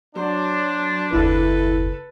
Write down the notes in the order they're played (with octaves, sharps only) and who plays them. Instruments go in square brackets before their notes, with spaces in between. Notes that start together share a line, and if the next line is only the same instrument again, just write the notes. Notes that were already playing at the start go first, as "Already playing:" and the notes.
[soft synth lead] F#3 [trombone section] D4 [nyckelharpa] C5
[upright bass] F#1 D#2 [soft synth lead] E4 [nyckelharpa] A4 B4